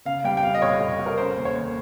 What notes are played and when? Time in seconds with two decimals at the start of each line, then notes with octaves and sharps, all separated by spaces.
0.05 C#3 F5
0.24 G3 G5
0.37 G5
0.43 F2 F5
0.55 D#5
0.62 F1 C#5
0.80 F1
0.99 F1
1.06 A#4
1.18 C#4 C5
1.37 D#2
1.45 C#5
1.55 D#2